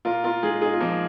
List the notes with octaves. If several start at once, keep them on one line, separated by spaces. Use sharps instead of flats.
A#2 F4 A#4
F4 A#4
G#3 D#4 G#4
D#4 G#4
F4
F3 A#3 D#4